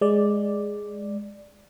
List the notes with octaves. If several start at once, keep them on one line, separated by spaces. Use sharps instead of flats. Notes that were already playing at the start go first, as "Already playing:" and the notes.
G#3 D5